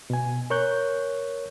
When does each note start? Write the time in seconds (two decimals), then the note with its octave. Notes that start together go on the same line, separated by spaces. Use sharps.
0.10 B2 G#5
0.50 A#4 C#5 C#6 F#6 G6